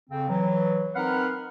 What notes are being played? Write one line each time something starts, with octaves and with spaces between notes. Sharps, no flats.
F2 C#3 C4
E3 F#3
C4 D#4 A#4 B4 F5 F#5